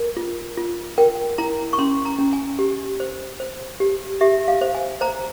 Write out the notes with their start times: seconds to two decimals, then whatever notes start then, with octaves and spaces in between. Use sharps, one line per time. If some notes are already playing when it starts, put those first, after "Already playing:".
Already playing: A#4
0.17 F4
0.57 F4
0.98 A#4 G5
1.38 E4 A#5
1.73 C#6
1.78 C#4 C6
2.05 A#5
2.19 C#4
2.33 G#5
2.59 G4
3.00 C5
3.40 C5
3.80 G4
4.21 G4 E5
4.48 F5
4.61 C5
4.75 G#5
5.01 C5 A#5